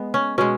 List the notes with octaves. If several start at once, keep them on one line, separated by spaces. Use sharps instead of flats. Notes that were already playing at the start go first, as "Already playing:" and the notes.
Already playing: G#3 B3
C#4
B2 G#3 C#4